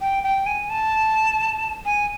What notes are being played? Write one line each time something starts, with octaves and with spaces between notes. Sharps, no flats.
G5
G5
G#5
A5
G#5